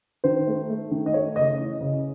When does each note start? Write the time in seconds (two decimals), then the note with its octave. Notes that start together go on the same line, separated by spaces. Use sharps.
0.24 D#3 C5
0.47 A3
0.70 A3
0.91 D#3
1.06 D#5
1.13 A3 C#5
1.36 C#3 D#5
1.59 E3
1.81 C#3